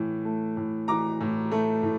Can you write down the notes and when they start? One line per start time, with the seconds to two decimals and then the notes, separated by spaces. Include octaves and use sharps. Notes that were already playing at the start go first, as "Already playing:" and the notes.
Already playing: A2 E3
0.25 A3
0.57 A2
0.88 E3 A#5 D6
1.21 A2
1.52 A3
1.83 A2